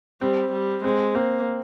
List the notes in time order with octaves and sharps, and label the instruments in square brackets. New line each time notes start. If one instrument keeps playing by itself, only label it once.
[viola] G3 [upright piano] C4
[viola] G3
[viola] G#3 [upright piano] C4
[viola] A#3 [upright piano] C4